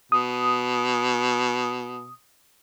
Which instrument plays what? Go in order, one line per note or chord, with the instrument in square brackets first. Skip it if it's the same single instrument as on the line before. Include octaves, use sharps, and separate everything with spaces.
[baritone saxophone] B2 [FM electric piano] D#6